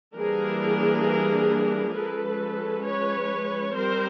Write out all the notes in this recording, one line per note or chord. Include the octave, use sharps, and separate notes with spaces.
E3 G3 A#3 D4 G#4 A#4
F3 G#3 C#4 A4 B4
B4 C#5
G3 C4 A#4 C5